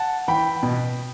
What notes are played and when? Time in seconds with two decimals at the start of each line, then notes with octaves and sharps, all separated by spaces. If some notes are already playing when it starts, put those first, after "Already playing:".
Already playing: F#5 A5
0.28 E3 G5 B5
0.63 B2